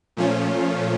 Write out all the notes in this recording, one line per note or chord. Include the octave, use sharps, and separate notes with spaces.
A#2 F3 A3 C#4 F4